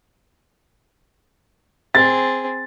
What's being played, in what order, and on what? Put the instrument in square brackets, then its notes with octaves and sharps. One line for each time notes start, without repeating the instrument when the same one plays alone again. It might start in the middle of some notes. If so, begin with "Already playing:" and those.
[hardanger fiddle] C4 G#4 [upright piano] A6